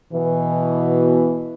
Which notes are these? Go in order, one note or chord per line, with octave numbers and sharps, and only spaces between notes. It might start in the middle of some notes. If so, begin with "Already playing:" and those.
B2 E3